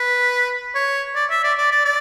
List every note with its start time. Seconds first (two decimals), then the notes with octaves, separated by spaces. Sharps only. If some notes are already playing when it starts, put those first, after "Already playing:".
Already playing: B4
0.75 C#5
1.15 D5
1.30 E5
1.43 D5
1.58 D5
1.72 D5
1.85 D5